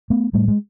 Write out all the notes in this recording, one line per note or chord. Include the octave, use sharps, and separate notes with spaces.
A3 B3
A2 G3 A3
G#3